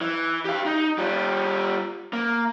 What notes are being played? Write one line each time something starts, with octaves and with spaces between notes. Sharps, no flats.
E3
G4 F5
D#4
G3 F4
A#3